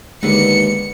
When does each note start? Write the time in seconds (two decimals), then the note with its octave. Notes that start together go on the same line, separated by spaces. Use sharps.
0.23 D#2 D3 G#3 B3 C#7